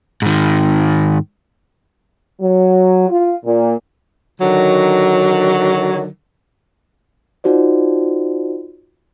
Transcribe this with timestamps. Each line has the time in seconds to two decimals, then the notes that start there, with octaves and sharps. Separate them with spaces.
0.22 G#2 D#3
2.41 F#3
3.09 F4
3.45 A#2
4.40 D3 D#3 F#3
7.44 D#4 F4 F#4 C5 D5